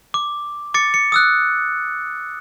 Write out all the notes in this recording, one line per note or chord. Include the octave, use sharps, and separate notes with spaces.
D6
D6 A6 C#7
C#7
D#6 E6 F#6